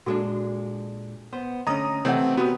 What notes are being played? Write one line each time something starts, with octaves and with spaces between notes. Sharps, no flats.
A#2 G#3 D4 F#4 A4 D6
B3 C5
D3 A3 C#4 D#5 A#5 D#6
C3 E3 A3 C4 C#5 D#5 F#5
B3 F#4 G4 B4 A#5 D#6